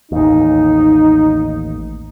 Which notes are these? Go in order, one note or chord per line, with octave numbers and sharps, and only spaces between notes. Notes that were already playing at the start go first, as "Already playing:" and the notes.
A1 D#2 D#4